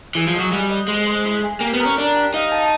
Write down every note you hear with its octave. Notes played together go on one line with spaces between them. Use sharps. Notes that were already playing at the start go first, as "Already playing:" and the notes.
E3 G#4
F3
D#5
F#3
G3 F#5
D#5
G#3 C4
C5
E4
G#4
A#3 G4
B3
A#4
C#4
D4 A#4
G4
D#4 F5
A5